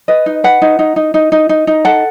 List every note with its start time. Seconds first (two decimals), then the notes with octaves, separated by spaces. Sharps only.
0.08 B4 D#5
0.26 D#4
0.44 B4 F#5
0.62 D#4
0.79 D#4
0.96 D#4
1.14 D#4
1.32 D#4
1.49 D#4
1.67 D#4
1.85 A4 F#5